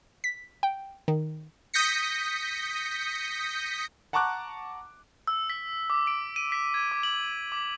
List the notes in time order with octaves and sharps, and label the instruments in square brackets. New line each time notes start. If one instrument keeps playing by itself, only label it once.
[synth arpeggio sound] B6
G5
D#3
[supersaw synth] D#6 G6 A#6 B6 C#7
[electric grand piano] F#5 A5 A#5 C#6 D6 F#6
[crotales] E6
B6
D6
D7
D#7
B6
G#6
D6
F#7
D6